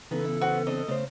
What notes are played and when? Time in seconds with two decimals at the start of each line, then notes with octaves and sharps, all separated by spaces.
0.11 C#3 E3 B3 D#4 A4
0.25 E4
0.41 B3 F#4 C5
0.67 C4 D4 D#5
0.88 C#3 A3 C5